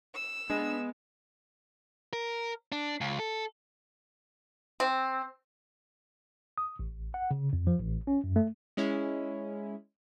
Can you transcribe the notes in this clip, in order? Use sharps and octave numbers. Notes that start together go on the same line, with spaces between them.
E6
G#3 B3 D4
A#4
D4
C#2
A4
C4
D#6
A1
F#5
C#3
F2
F3
A1
C#4
F#2
A3
G#3 C#4 E4